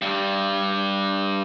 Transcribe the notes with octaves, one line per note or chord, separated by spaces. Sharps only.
G2 G3